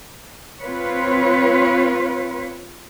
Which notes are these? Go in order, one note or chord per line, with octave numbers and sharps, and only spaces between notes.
C4 F4 B4 C#5